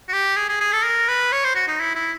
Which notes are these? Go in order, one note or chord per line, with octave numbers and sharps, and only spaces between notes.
F#4
G4
G#4
G#4
G#4
A4
A#4
B4
C#5
C5
F#4
D#4
E4
E4